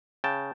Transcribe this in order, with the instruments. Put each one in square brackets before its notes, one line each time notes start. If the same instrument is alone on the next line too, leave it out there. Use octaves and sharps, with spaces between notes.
[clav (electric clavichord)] C#3 G5 A5